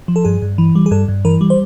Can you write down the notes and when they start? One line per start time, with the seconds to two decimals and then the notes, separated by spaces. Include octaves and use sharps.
0.08 F3
0.16 A4
0.25 G2 G#4
0.42 G2
0.58 E3
0.75 G3
0.86 G#4
0.91 G2 A4
1.08 G2
1.25 E3 A#4
1.41 G3
1.50 C5